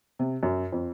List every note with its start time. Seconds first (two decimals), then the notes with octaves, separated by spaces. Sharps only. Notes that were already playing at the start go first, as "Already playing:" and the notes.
0.19 C3
0.43 F#2
0.72 F2